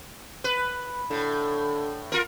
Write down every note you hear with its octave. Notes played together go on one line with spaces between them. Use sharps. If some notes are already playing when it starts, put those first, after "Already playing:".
B4
A2 D3
F4 A#4